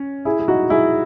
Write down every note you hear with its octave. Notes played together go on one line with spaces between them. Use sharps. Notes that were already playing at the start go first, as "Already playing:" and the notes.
Already playing: C#4
E4 G#4
G#4
D#4 F#4
E4 G#4